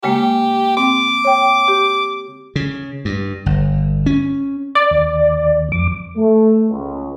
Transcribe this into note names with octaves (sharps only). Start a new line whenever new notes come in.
C#3 G#3 A#3 G4
C4 D6
C#5 G5
G4
C#3
G2
G1
C#4
D5
D#2
F2 D6
A3
C#2